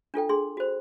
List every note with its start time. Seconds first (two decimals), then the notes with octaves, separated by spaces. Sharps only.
0.14 D4 F4 A4 G5
0.29 D4 G#4 C6
0.57 F#4 C5